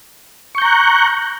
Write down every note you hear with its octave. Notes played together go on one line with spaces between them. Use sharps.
A#5 C#6 F#6 G6